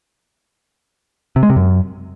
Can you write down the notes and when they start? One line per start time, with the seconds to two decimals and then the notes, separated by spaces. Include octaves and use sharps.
1.36 C3
1.43 G#3
1.50 C3
1.56 F#2